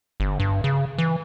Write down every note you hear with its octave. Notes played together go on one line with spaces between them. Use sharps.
G1
G2
C#3
E3